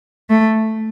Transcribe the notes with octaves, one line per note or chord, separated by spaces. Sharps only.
A3